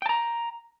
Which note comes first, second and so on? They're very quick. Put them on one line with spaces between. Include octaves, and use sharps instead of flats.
G5 A5 A#5